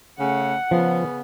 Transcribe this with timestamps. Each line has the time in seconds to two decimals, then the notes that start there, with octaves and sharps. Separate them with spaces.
0.19 C#3 A3 F#5
0.71 C#3 F3 B3